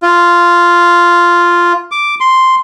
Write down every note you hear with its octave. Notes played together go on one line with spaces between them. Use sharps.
F4
D6
C6